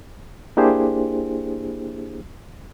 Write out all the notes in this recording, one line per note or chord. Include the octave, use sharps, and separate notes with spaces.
A#3 D4 E4 G4 G#4 C5